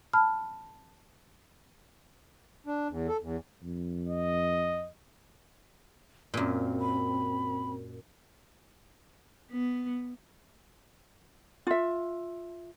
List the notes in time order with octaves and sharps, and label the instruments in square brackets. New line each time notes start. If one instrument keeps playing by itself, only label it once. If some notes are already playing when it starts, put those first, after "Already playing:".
[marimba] A5 B5 F6
[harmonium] D4
E2
A4
E2
[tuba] F2
[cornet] D#5
[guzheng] F#2 A#2 [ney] C4
[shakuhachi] B5
[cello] B3
[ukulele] F4 E5